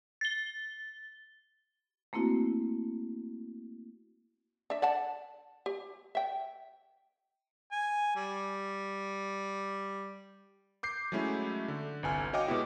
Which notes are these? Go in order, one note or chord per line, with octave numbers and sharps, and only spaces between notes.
A6 G7
A3 A#3 C4 E4 F#4
D4 E5
D5 F#5 A5
G4
E5 G5
G#5
G3
D6 G6 C7
F#3 G#3 A3 C#4 E4
D3
G1 C2 G#5 F6
F#4 C#5 D#5 F5 G5 D6
B2 G#3 B3 E4 G4